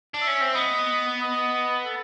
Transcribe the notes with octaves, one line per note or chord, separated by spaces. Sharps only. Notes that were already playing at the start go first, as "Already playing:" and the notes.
D4
E5
C#4
C4
B3 D#5
D#5
A4